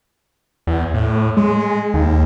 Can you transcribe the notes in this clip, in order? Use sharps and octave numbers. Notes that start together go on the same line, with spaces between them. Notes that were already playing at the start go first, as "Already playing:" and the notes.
E2
A2
G#3
D#2